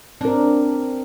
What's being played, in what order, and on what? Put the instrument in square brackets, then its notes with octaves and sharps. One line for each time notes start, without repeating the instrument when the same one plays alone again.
[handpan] C4 A#4 [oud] D4